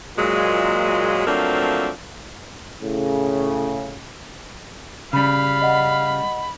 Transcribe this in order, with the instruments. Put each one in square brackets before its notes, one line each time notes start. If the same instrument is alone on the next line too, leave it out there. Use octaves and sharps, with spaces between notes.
[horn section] A#2 F#3 G#3
F3 F#3 A3 A#3 C4 D4
[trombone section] A2 C#3
[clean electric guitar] C#3 G3 [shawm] F5 [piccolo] B5
[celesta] D#5 F#5